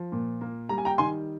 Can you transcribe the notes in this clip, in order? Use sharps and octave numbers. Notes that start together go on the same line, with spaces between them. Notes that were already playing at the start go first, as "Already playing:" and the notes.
Already playing: F3
A#2
A#3
G3 A#5
G#5
G5 A#5
D#3 G#5 C6